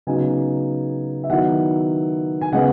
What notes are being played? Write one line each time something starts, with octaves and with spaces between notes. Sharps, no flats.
C#3 F#3 B3 D#4 G#5
E5
D#3 F#3 B3 E4 F#5
G#5
C#3 G#3 B3 F#5